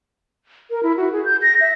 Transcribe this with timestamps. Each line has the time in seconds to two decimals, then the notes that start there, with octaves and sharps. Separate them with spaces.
0.71 A#4
0.83 E4
0.97 F#4
1.12 G#4
1.25 G6
1.42 A#6
1.61 E5